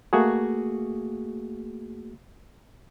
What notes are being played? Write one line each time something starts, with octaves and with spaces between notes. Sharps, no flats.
A3 A#3 F#4 G#4